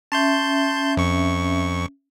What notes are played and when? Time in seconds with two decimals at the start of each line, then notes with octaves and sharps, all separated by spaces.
0.12 C#4 E5 A5 C6 G6
0.97 F2 C#6